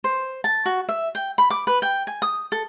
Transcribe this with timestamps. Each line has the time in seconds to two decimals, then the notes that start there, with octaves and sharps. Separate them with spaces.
0.04 C5
0.44 A5
0.66 F#4
0.89 E5
1.15 G5
1.38 B5
1.50 D6
1.67 B4
1.82 G5
2.07 G#5
2.22 D#6
2.52 A4